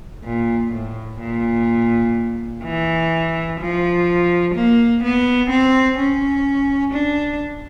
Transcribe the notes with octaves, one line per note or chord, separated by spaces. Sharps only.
A#2
A2
A#2
E3
F3
A#3
B3
C4
C#4
D4